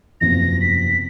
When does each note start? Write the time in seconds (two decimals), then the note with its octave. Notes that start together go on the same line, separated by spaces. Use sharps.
0.20 F#1 E2 C3 F3 A#6
0.61 B6